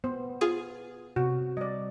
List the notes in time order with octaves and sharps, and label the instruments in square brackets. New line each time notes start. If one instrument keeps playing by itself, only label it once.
[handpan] B3 [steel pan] C5
[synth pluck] F4 G#4 D#6
[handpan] C3 [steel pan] F#4
[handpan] G3 [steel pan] D5 D#5